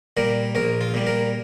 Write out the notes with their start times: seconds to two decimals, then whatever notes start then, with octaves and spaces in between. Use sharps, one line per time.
0.17 A#2 G3 A#4
0.55 A#1 A#4
0.81 F4
0.94 A#2 G3
1.07 A#4